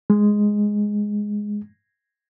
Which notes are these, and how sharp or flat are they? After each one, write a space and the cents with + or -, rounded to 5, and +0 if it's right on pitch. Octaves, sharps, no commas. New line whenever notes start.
G#3 +0